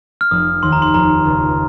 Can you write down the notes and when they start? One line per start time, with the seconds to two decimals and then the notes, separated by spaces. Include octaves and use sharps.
0.21 F6
0.31 F1 D#6
0.63 D#2 C6
0.72 A#5
0.82 C6
0.94 F1 A#5
1.25 C#2